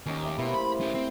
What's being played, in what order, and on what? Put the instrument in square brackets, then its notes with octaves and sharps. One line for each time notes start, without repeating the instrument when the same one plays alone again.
[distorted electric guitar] D#2 [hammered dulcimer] C#4 D#4 G4
[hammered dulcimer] A3 A#3 E5
[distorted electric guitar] B2 [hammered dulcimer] E4 C5
[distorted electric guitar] B5
C#4 G4
C4